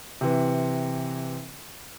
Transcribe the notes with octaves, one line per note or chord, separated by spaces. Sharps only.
C3 E3